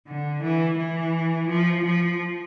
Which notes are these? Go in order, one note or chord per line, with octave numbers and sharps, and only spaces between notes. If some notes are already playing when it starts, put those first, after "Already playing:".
D3
E3
E3
F3
F3